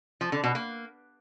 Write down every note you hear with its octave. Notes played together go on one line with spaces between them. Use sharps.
F3
D3
B2
A#3